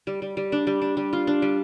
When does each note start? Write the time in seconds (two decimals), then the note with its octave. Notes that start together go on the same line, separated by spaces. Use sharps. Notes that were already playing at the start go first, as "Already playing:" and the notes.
0.07 G3
0.22 G3
0.37 G3
0.52 D4
0.67 G3
0.82 D4
0.97 G3
1.13 F4
1.27 D4
1.42 G3